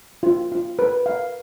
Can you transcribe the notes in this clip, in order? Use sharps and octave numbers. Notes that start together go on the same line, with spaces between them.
F4
F4
B4
F5